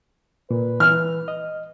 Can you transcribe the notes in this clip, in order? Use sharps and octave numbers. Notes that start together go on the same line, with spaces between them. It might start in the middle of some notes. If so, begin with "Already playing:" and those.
A#2 B4
E3 F6
D#5